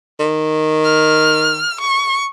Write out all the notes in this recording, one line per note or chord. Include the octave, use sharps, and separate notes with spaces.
D#3
F6
C#6